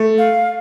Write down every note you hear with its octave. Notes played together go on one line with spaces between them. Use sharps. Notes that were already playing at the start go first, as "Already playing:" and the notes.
Already playing: A3
F5